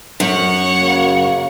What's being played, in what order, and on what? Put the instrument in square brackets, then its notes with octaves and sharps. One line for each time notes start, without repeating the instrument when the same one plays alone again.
[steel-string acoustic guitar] F#2 [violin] C#5 F#5
[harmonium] C#3 F#3 A#3